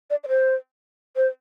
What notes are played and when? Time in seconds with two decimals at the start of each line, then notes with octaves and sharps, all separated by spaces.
0.10 D5
0.24 D5
0.28 C5
1.16 C5